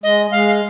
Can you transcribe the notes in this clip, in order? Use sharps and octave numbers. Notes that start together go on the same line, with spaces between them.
G#3 D#5
G#3 F5